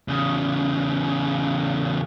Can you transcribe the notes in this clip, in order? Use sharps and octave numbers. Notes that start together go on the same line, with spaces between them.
E2 C#3